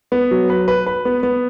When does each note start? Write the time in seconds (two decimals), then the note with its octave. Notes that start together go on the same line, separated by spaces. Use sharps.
0.12 B3
0.31 F#3
0.50 B4
0.68 B4
0.86 B4
1.05 B3
1.23 B3